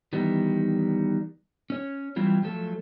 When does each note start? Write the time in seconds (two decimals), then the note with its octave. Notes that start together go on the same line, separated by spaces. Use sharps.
0.13 D#3 E3 G3 B3
1.70 C#4 C#5
2.16 E3 F#3 G3 C4 E4 F4
2.43 F3 F#3 A3 A4